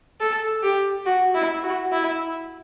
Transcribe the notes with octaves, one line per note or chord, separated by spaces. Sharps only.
A4
G4
F#4
E4
F#4
E4